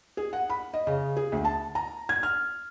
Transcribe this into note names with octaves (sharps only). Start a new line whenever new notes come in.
G#4
F#5
B5
D#5
C#3
G#4
D2
A5
A#5
G#6
F6